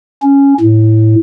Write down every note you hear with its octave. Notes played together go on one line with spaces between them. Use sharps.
C#4
A2